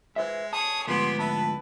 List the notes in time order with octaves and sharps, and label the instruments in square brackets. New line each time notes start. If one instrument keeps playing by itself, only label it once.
[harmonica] G#3 [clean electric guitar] B4 C5 E5
[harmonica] G#4 C#5 [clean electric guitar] A5 [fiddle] D#6
[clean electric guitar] D2 G#2 F3 [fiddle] B3 [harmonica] G4 G5 G#5 [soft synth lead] C6
[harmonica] E4 B4 [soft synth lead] A5